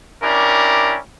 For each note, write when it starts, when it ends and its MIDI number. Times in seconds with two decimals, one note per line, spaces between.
0.22 0.97 61
0.22 0.97 62
0.22 0.97 64
0.22 0.97 67
0.22 0.97 70